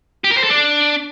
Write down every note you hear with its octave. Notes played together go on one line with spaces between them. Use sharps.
G4
A#4
C5
A4
D4